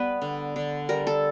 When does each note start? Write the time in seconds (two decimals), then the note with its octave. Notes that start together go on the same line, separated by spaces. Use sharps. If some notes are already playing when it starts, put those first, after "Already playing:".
Already playing: G3 B3 B4
0.22 D3
0.56 D3
0.89 G3 A#4
1.07 A4